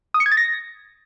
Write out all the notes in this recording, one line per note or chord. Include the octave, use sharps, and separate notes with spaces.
D#6
C#7
G#6
A6
A#6